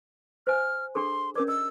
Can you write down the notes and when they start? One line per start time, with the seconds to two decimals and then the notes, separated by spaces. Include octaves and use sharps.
0.47 C5 E5 G#5 F6
0.95 D4 G#4 A4 C6
1.36 C#4 A#4 D5 D6
1.48 D#5 E6